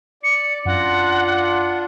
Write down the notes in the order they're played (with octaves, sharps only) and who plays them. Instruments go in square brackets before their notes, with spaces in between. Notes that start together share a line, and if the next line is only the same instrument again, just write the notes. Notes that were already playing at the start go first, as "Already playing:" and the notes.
[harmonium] D5 [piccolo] C#7
[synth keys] F#2 A#6 [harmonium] D4 F4 [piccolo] F#5